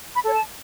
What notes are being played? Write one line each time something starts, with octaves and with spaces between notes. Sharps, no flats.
B5
A4 C#5
A5